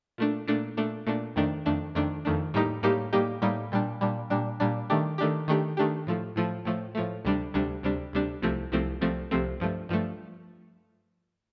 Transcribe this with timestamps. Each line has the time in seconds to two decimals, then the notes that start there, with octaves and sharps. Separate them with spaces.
0.18 A#2 A3 D4
0.48 A#2 A3 D4
0.77 A#2 A3 D4
1.07 A#2 A3 D4
1.36 F2 D#3 A3 D4
1.65 F2 D#3 A3 D4
1.95 F2 D#3 A3 D4
2.25 F2 D#3 A3 D4
2.54 A2 G3 A#3 D#4 G4
2.83 A2 G3 A#3 D#4 G4
3.13 A2 G3 A#3 D#4 G4
3.42 A2 G3 A#3 D#4 G4
3.72 A#2 G3 D4
4.01 A#2 G3 D4
4.30 A#2 G3 D4
4.60 A#2 G3 D4
4.90 D#3 A3 D4 G4
5.18 D#3 A3 D4 G4
5.48 D#3 A3 D4 G4
5.77 D#3 A3 D4 G4
6.07 A2 F3 A3
6.36 A2 F3 A3
6.65 A2 F3 A3
6.95 A2 F3 A3
7.25 D2 C3 G3 D4
7.54 D2 C3 G3 D4
7.83 D2 C3 G3 D4
8.13 D2 C3 G3 D4
8.42 C2 C3 F3 A3 C4
8.72 C2 C3 F3 A3 C4
9.01 C2 C3 F3 A3 C4
9.31 C2 C3 F3 A3 C4
9.60 G2 F3 A3
9.89 G2 F3 A3